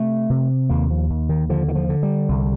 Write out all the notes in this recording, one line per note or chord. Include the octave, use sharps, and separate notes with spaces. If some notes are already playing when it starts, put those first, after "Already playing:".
Already playing: C3 A3
C3
D#2 A#3
F3
D#2
D#3
D3 F3
D#3
F3
D3
G3
C2